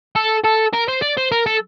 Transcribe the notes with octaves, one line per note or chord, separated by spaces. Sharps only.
A4
A4
A#4
C5
D5
C5
A#4
A4